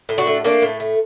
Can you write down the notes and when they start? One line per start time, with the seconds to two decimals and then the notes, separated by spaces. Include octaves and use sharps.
0.09 A2
0.18 D4 F#4
0.27 A3
0.44 A3 A#3 D4
0.62 A2
0.80 A3